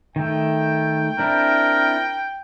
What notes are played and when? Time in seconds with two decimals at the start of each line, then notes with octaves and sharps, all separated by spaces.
0.16 D#3 A3 G5
1.19 C4 D4 E4 A#4